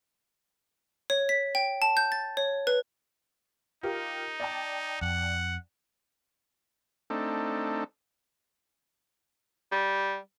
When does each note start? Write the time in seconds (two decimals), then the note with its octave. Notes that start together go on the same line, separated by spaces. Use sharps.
1.10 C#5
1.29 B6
1.55 G5
1.82 A5
1.97 G6
2.12 A6
2.37 C#5
2.67 B4
3.83 D#4 F4 G4 A#4
4.40 D5 G5 A5
5.01 F2 F#5
7.10 A3 C4 D4 D#4 A4
9.72 G3